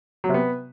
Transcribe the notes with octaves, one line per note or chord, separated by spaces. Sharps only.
F#3
C3
B3